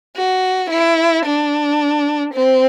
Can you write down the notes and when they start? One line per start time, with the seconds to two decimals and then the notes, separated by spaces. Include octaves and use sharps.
0.17 F#4
0.70 E4
1.25 D4
2.34 C4